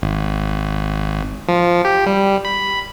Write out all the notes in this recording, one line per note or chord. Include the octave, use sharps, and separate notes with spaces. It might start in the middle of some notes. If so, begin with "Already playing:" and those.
G#1
F3
G4
G3
B5